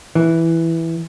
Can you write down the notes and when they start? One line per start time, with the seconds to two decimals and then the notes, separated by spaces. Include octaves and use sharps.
0.15 E3